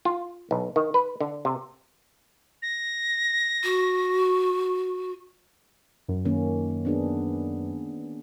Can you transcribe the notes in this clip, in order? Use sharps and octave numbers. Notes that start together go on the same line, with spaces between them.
F4
B1
D#3
B4
D3
C3
A#6
F#4
F#2
D#3 A#3 C#4
B3 D4 G#4